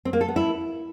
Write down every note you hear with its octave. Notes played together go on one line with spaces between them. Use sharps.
C4
A#3
A4
B3
E4